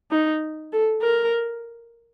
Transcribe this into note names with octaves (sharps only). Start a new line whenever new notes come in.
D#4
A4
A#4